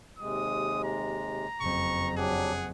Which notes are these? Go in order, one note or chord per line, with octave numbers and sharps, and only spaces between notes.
D#2 C3 G#3 D#6
A#5
F#1 F2 C#6
F#3 D4 G4 G#4 F#5